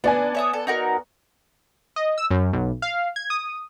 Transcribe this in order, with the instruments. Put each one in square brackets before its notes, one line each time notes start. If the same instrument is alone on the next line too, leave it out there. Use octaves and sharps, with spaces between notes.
[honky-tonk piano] B3 D5 G#5 [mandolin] D4
[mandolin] C#5 E5 D#6
A4
D#4 F#4 A#4
[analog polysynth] D#5
E6
F#2
B1
F5
G#6
D#6